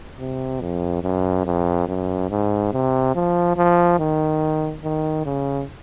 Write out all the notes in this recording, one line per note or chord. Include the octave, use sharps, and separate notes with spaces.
C3
F2
F#2
F2
F#2
G#2
C3
F3
F3
D#3
D#3
C#3